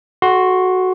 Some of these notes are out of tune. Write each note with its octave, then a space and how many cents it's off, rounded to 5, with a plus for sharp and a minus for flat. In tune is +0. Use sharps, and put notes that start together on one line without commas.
F#4 +0 A4 -30 C6 +20